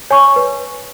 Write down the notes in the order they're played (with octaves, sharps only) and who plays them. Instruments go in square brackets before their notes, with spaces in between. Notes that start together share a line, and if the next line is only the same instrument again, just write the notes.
[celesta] C#5 G#5 C#6
B4